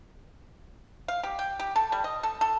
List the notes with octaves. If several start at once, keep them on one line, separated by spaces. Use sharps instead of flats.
F5
G4
G5
G4
A4
G3
D#5
A4
A4